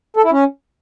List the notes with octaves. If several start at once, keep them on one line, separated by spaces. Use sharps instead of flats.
A4
E4
C#4